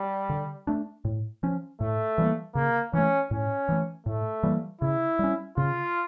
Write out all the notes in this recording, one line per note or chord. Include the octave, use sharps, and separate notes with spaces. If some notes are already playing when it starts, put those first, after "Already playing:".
Already playing: G3
D3
A3 D4
A2
F3 C#4
A2 A3
E3 G3 A#3
C#3 A#3
E3 A3 C#4
A2 C#4
E3 A3
A2 A3
E3 G3 A#3
C#3 E4
G3 C#4
C#3 F4